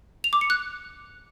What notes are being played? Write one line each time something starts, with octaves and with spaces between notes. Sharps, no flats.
F7
D6
C#7
F#6